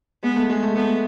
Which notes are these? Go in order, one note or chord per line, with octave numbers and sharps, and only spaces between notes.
G#3 B3
A3
G#3
A3
A3 B3